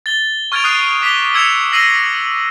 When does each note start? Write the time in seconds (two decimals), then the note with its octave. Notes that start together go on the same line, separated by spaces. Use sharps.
0.06 A6 G7
0.52 C#6 F6 G#6 A6 D7 F7
0.64 D#6 F6 F#6 C7 D#7
1.02 D6 B6 F7 G7
1.34 E6 G#6 C#7 E7 F7
1.72 E6 A#6 C7 D#7 F#7